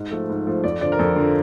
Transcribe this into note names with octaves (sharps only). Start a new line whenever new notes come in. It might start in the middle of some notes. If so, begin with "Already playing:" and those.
Already playing: G#2 D#5
F3 A3
G#2
F3 A3
F2 D5
D3 F3 D5
A#4
F2 A4
D3 F3